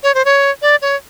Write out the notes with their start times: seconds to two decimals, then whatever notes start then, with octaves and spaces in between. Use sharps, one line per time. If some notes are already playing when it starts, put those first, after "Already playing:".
0.03 C#5
0.15 C5
0.25 C#5
0.62 D5
0.82 C#5